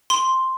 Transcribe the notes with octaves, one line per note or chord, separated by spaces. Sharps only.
C6